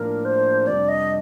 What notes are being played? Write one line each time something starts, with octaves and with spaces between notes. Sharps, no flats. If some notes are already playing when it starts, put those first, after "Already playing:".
Already playing: A2 F3 A#3 D4 A#4
C5
F2 C3 G3 D4 D5
D#5